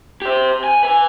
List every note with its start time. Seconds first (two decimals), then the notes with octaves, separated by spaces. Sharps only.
0.22 G4 C5
0.64 G#5
0.83 B4 G#5